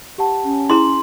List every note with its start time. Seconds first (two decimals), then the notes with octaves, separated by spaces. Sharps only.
0.18 G4 F#5 A5
0.44 C#4
0.70 E4 G#4 A#5 C6